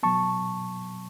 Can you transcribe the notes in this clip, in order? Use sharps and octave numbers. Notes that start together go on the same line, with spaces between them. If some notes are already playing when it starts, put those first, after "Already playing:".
B2 F#3 B3 A5 C#6